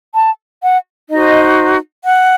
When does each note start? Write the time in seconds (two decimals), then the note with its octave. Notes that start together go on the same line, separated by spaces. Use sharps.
0.15 A5
0.62 F#5
1.10 D#4 F#4 C5 D#5
2.04 F#5